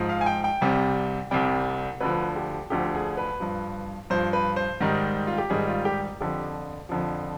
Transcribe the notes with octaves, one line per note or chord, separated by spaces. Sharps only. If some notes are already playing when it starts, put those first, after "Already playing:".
Already playing: G#2 F3
F5
G#5
G5
G5
C2 C3 G3
C2 C3 G3 G5
D2 D3 F3 B4
G4
D2 D3 F3 G4
G#4
B4
G2 F3
G2 F3 C5
B4
C5
G#2 D#3 G3
F4
G4
G#2 D#3 G3 G#4
F4
G4
F2 D3 F3 G4
F2 D3 F3